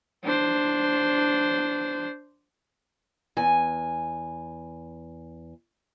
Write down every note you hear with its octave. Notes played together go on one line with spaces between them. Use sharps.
D4 C5
E2 G#5